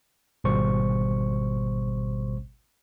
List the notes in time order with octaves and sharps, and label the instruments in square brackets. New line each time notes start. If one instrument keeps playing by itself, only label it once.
[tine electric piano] G#1 B2 G3 C5 C#6